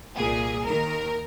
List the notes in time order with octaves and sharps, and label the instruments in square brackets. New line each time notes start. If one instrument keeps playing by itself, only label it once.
[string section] C2 A#2 G#4
D#2 D#3 A#4